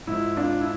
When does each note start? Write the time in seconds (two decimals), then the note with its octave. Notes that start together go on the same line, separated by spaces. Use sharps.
0.07 G#2 F3 E4
0.37 D4 F4
0.61 E4